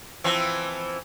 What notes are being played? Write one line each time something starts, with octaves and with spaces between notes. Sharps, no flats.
E3 F3 C4